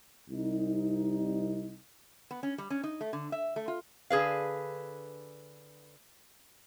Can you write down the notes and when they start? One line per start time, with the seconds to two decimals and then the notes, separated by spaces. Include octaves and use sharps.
0.30 C2 D#4
2.31 B3
2.43 C#4
2.58 G3
2.70 C#4
2.84 D#4
3.01 A3
3.13 D3
3.32 E5
3.56 A3
3.68 F4
4.10 D3 G#4 B4 F5